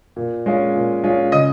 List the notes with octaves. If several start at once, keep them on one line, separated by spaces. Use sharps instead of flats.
A#2
G#3 C#4 F4
A#2
G#3 C#4 F4
C#3 D#5 D#6